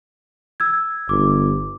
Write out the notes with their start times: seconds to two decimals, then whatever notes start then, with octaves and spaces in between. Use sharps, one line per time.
0.60 E6 G#6
1.09 G1 D6